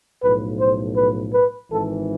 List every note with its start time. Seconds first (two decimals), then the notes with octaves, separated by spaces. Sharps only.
0.23 B1 A2 F3 B4
0.60 C5
0.97 B4
1.34 B4
1.70 G#1 G#2 E3 A4